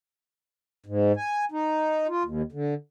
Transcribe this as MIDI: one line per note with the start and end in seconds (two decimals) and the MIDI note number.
0.86 1.12 44
1.17 1.45 80
1.52 2.07 63
2.08 2.23 65
2.24 2.42 39
2.52 2.74 50